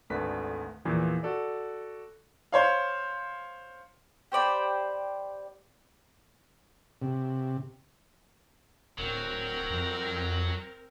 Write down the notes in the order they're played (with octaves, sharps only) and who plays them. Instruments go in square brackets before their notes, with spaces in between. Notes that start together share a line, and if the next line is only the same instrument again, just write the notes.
[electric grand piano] G#1 D2 D3 A3 B4 B6
E2 A#2 E3 F3
F#4 A4 D5
[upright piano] C5 C#5 F5
[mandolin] G4 C5 D5 B5
[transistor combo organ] C3
[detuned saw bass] D1 [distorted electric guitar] F#3 [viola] C4 A#4
[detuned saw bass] F2